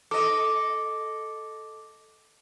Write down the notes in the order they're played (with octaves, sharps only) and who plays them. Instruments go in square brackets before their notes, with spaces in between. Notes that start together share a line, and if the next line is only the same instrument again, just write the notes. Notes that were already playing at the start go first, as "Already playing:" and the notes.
[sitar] A4 D#5 [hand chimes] D6